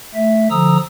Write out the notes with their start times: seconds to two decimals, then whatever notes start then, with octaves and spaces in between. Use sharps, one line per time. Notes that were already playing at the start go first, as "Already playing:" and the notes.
0.14 A3 E5
0.50 D3 F3 A#5 D#6 E6